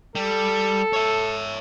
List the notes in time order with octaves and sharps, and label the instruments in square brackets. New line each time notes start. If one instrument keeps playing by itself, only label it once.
[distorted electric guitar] G3 [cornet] A4
[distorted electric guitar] C#5 E5